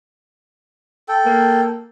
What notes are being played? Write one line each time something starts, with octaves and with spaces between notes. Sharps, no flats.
A4 G5
A#3